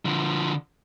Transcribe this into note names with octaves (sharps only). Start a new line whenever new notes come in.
D3 F3